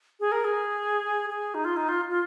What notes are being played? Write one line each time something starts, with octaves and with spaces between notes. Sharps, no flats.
G#4
A#4
G#4
G#4
D#4
F4
D#4
F4
F4